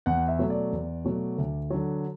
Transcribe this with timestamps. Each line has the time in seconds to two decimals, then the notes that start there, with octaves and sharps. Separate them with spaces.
0.06 E2 F#5
0.28 E5
0.39 B2 F#3 A3
0.50 D5
0.72 E2
1.05 B2 F#3 A3
1.38 D2
1.70 D3 F#3